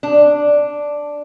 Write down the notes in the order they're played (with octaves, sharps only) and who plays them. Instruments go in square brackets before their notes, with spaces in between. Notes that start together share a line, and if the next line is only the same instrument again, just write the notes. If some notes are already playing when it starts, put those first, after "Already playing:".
[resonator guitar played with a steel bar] D4